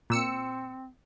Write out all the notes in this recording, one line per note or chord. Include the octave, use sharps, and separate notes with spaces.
A#2 C4 E6 C#7